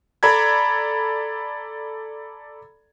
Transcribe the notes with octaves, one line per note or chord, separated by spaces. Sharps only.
A4 D5 A#5 B5 G#6